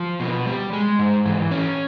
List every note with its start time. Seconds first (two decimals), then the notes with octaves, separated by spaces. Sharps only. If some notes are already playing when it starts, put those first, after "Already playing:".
Already playing: F3
0.20 B2
0.46 G3
0.73 G#3
0.99 G#2
1.26 E3
1.51 C#4